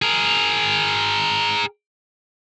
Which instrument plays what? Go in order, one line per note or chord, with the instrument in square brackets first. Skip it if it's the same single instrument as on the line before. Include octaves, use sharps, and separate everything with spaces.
[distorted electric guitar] G#4 A#4